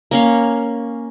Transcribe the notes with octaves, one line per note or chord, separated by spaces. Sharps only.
A#3 C#4 F5